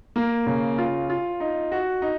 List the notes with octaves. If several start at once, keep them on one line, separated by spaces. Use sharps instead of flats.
A#3
C#3
F4
F4
D#4
F#4
D#4